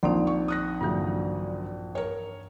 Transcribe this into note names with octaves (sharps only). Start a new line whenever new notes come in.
A#1 A#3 C4 D#4
C#6
D#6 F#6 A#6
G2 A#2 D3 E3 F#3
A#4 C#5